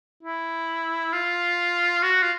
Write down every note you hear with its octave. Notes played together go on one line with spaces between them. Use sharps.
E4
F4
F#4
F4